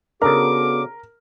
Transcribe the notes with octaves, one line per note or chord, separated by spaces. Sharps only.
C#3 B3 D4 F#4 A4 A#4 D6